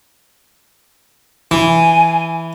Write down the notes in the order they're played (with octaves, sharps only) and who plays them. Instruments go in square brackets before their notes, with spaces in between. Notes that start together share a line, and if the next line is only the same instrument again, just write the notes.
[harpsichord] E3 [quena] G#5